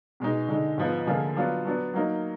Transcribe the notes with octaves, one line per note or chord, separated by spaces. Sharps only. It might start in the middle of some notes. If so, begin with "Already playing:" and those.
B2 G#3 D#4
D3 G#3 D#4
G#2 F3 B3
D3 F3 A#3 F4 G#4
F#3 B3 D4 F4
F#3 B3 D4
F#3 A#3 D#4